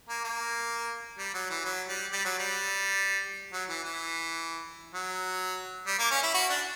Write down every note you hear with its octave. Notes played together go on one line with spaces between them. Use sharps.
A#3
A#3
G3
F#3
E3
F#3
G3
G3
F#3
G3
F#3
E3
E3
F#3
G3
A#3
C#4
E4
F#4
D4